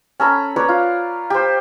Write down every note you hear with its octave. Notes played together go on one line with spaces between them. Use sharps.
C#4 A4 A#5 B5
B4 C#5 D5 A#5
F4
G4 C5